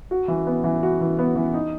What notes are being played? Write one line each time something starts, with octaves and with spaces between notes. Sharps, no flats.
F#4
E3
B3
E3
F#4
E3
B3
E3
D#4